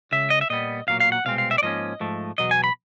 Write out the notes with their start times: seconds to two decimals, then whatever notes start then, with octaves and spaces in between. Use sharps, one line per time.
0.12 C#2 C#3 E5
0.30 D#5
0.41 E5
0.50 A#2 G3 B3 D#5
0.87 B1 A#2 F#3 A#3 F5
1.00 F5
1.12 F#5
1.25 C2 B2 G#3 C4 F5
1.38 F5
1.51 E5
1.58 D5
1.62 G#2 F3 A#3 C#4 D#5
2.00 G#2 F3 A3
2.38 E2 B2 F#3 D#5
2.51 G#5
2.64 B5